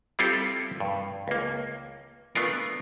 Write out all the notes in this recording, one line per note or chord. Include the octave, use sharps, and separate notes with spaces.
G3 C4 E4 F4 G4 A4
G2
C#2 A#3
A3 B3 D4 F4 A#4